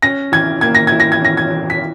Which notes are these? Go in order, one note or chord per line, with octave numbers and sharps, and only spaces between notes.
C#4 A#6
E3 G#6
A#3 G#6
A#6
E4 G#6
A#6
G#6
C#4 A#6
G#6
E3
B6